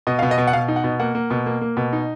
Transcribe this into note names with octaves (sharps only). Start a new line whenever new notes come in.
B2 D#5
B2 F5
D#5
B2
F#5
B2 F5
D#4
F#5
B2
A#3 F#5
A#3
B2
A#3
A#3
B2
D#4